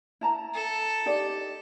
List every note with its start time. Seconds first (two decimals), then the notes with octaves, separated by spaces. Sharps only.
0.21 E4 A5 A#5
0.55 A4
1.06 D#4 G4 D5